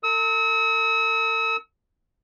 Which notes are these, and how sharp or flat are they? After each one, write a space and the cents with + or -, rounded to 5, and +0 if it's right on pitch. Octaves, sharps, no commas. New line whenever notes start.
A4 +45 E6 -40